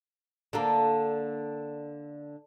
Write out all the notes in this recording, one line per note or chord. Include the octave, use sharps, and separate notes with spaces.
D3 A#3 D4 A4